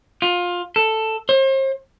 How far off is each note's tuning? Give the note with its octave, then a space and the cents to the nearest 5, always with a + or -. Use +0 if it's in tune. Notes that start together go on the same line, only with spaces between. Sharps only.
F4 +20
A4 +5
C5 +40